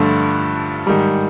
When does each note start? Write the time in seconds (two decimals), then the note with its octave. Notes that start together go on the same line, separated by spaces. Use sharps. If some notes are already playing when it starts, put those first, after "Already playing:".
Already playing: G2 D3 F3 A3
0.87 G#2 D#3 G3